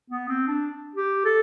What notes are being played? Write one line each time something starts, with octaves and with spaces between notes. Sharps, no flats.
B3
C4
D4
G4
A4